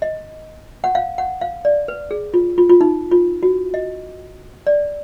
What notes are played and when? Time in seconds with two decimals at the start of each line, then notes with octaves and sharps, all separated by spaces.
0.02 D#5
0.84 F#5
0.95 F5
1.18 F#5
1.41 F5
1.65 D5
1.88 B4
2.11 G#4
2.34 F4
2.58 F4
2.69 F4
2.81 D#4
3.12 F4
3.43 F#4
3.74 D#5
4.67 D5